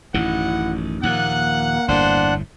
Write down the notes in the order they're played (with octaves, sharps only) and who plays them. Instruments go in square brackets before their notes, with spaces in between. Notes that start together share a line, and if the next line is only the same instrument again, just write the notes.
[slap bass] A1 F#2 D#3 [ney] E4 [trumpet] F#5
[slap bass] D#2 A#2 F3 [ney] A#3 [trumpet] F#5 [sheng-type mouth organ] F#6
[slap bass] G1 E2 A2 [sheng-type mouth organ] D4 F#5 F#6 [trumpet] C5